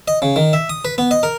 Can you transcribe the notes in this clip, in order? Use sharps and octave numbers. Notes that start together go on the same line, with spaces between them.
D#5
C#3
D#3
E5
D#6
B4
B3
D#5
A#4